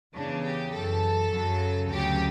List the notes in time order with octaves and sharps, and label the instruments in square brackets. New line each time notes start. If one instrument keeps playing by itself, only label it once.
[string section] E2 C#3 E3 D4
G4
F#2 E3 A4
F#2 C#3 F#3
D2 C#3 F#3 G4